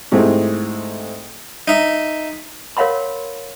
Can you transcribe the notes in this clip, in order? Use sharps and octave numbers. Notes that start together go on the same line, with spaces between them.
G#2 C3 E3 G#3 A3 C4
D#4 E5
A#4 C#5 F5 F#5 B5 C6